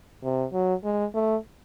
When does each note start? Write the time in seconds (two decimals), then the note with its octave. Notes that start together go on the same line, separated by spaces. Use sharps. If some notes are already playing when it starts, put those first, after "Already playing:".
0.23 C3
0.53 F#3
0.84 G#3
1.15 A3